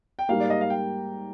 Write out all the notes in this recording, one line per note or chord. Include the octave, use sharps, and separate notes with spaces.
G5
G#2 G3 A#3 F5
D5
D#5
F5
G5